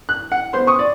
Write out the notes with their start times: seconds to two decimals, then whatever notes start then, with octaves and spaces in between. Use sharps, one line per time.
0.09 F#6
0.32 F#5
0.53 B3 C5 C6
0.67 C#6 D#6
0.79 D5